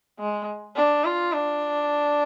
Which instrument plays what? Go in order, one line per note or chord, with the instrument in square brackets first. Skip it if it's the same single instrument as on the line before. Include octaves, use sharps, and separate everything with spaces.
[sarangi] G#3
D4
F4
D4